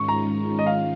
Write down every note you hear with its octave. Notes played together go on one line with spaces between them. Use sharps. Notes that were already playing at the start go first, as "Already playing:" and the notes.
Already playing: G#2 D#3 G#3 C#4 F4 C#6
A#5
D#5
F5